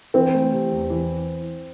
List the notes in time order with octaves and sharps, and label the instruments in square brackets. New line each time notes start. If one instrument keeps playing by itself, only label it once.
[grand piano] E3 [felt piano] C4
[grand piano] A3
C3
E2
E3